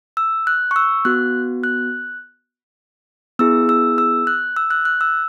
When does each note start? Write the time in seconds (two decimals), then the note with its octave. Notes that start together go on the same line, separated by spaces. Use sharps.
0.17 E6
0.47 F#6
0.71 C#6
0.76 E6
1.05 B3 F#4 F#6
1.64 F#6
3.39 B3 E4 G#4 E6
3.69 E6
3.98 E6
4.27 F#6
4.56 E6
4.71 F#6
4.85 F#6
5.01 E6